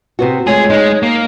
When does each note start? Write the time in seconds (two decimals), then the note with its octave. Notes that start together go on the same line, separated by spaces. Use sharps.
0.19 C3 B3 F#4
0.47 G#3 A3 F4 G#4 C#5
0.70 G#3 D#4
1.03 A#3